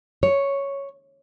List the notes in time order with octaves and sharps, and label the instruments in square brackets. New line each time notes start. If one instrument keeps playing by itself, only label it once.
[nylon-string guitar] C#5